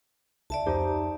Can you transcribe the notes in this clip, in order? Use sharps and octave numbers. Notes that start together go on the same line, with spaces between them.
C#2 D5 E5 A5
F2 D#4 G4 C5